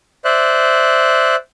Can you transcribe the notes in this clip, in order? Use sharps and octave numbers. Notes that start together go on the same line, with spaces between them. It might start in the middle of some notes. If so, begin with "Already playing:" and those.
C5 D5 E5 F#6